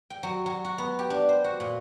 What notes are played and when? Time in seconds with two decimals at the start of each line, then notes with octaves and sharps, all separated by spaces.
0.10 G5
0.23 F#3
0.46 F#3
0.65 F#4
0.78 B3
0.99 G4
1.10 D4
1.29 C5
1.44 F#4
1.60 A#2